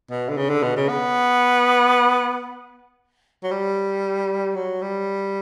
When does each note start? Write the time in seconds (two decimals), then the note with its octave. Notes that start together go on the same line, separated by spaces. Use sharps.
0.11 B2
0.29 D3
0.37 C#3
0.50 D3
0.63 B2
0.76 C#3
0.89 B3
3.43 F#3
3.51 G3
4.55 F#3
4.82 G3